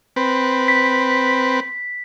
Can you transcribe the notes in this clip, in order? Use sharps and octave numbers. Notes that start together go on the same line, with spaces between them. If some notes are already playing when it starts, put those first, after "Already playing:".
C4 B4
B6